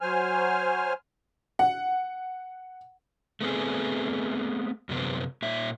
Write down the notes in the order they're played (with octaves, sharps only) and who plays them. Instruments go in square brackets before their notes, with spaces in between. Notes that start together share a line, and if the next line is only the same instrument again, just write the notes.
[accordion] F#3 C5 G#5 F6
[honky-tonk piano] F#5
[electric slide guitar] A3 B3 C4 G#4
F#2 C3 B3 C4
A#2 E5